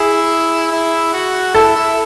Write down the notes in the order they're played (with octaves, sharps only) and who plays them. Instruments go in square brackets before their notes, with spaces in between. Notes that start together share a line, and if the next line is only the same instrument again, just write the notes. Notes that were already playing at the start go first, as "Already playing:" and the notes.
Already playing: [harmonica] E4 E5 [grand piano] G#4
[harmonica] E4 E5
F#4 F#5
[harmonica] E4 E5 [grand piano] A4
[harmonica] E4 E5